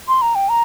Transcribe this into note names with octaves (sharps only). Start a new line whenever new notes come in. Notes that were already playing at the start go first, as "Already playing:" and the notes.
C6
A#5
G5
A#5